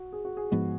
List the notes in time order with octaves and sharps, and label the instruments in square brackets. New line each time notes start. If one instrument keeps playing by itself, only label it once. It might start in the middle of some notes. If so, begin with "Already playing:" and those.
Already playing: [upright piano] F#4
G#4
F#4
G#4
[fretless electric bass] G#2 F3 G#3 B3 [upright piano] F#4